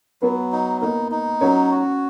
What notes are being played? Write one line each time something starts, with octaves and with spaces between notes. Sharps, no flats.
F#3 B3 B4
D#4
A#3 D#4 A#4
D#4
F#3 C#4 C#5
F#4